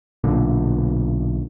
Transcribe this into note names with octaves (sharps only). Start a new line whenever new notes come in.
B1 A#2 D3